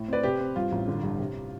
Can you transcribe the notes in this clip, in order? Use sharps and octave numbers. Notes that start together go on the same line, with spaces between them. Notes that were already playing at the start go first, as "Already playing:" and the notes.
Already playing: A2
C4 B4 D5
C3 G4 B4
C4
G2 F4
A1
D3
G2
C3